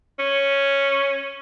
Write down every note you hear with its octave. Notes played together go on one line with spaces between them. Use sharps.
C#4